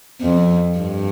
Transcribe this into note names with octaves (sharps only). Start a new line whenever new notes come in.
F2
G2